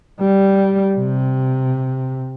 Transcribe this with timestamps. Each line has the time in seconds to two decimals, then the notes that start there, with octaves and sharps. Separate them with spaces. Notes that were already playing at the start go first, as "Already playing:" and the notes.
0.20 G3
0.96 C3